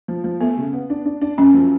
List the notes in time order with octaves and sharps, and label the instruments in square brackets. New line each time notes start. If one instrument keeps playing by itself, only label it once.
[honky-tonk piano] F3
F3
[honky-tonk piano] A3 [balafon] B3
[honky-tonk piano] C#3
B3
D4
D4
D4
[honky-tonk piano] F#2 [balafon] C#4
[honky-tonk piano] F3